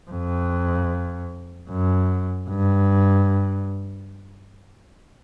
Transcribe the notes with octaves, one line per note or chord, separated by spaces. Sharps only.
F2
F#2
G2